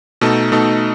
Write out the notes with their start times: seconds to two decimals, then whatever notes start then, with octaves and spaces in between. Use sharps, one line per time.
0.21 B2 A3 D#4 A4
0.52 B2 A3 D#4 A4